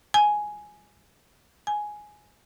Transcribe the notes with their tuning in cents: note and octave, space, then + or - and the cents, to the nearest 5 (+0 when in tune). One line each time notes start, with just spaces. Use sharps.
G#5 +10
G#5 +10